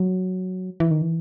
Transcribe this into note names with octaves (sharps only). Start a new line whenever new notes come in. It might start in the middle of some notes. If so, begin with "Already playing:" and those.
Already playing: F#3
E3
D#3
E3